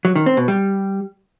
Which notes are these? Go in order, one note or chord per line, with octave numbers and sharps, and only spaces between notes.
F#3
D#3
C4
B2
G3